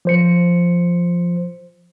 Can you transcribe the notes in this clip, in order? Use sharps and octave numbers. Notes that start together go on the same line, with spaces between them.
F3 C5 C#7